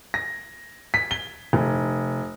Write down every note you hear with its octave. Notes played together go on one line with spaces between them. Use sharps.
A#6
B6
G7
F1